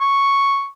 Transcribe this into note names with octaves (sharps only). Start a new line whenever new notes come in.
C#6